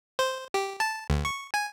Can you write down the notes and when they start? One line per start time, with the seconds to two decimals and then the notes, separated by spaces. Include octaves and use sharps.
0.19 C5
0.54 G4
0.80 A5
1.10 D2
1.25 C#6
1.54 G#5